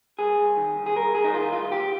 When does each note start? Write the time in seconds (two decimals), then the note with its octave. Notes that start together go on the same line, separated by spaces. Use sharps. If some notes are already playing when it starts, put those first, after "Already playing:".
0.19 C2 G#4
0.38 C2
0.57 D#3
0.76 C2
0.86 G#4
0.96 C2 A#4
1.15 C2 G#4
1.24 D#4
1.34 D#3 F4
1.53 C2 F4
1.72 D2 G4